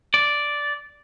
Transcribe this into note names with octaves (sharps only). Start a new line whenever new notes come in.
D5